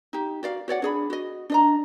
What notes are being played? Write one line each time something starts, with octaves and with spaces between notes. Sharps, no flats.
D#4 G4
F#4 D5 F5
F#4 C#5 D5 F#5
D4 G#4 B5
F#4 D#5
D4 D#5 A#5